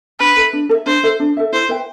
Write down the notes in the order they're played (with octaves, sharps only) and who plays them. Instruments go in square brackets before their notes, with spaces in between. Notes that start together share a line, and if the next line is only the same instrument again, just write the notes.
[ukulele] D4 [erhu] B4
[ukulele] A4 E5
D4
A4
E5
[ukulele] D4 [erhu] C5
[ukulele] A4 E5
D4
A4 E5
[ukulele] E4 [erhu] C5
[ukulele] B4 E5 G5